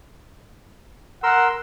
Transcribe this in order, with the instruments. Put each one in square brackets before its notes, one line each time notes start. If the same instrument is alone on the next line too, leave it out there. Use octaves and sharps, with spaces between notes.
[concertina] A#4 C6 E6 [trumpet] F#5